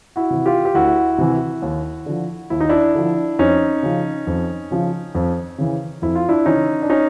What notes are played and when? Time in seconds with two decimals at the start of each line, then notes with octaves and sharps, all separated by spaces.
0.16 E4 F#4
0.30 C3 E3
0.46 F4 G4
0.65 G4
0.74 D2 E4 F#4
1.18 C3 E3
1.62 D#2
2.06 D3 F3
2.50 D#2 E4
2.60 D#4
2.69 D4 E4
2.95 D3 F3
3.39 F2 C#4 D#4
3.83 C#3 F3
4.27 F2
4.71 C#3 F3
5.15 F2
5.58 C#3 E3
6.02 F2 E4
6.15 F4
6.29 D4 E4
6.46 C#3 E3 C#4 D#4
6.82 D4
6.90 C#4 D#4